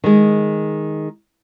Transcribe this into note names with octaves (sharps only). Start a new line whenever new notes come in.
D#3 G#3